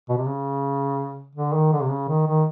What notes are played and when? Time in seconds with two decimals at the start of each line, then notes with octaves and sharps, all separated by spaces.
0.09 B2
0.18 C3
0.26 C#3
1.36 D3
1.53 D#3
1.73 D3
1.82 C3
1.90 C#3
2.08 D#3
2.27 D#3